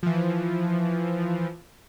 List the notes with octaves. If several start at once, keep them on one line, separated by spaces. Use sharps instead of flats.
E3 F3